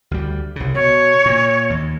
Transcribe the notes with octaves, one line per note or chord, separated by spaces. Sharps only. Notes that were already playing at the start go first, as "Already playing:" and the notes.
D2 G3
C2 C#3
B2 C#5
A#2
D#2